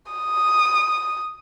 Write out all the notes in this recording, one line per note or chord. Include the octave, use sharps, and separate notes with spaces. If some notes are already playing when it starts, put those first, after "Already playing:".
D#6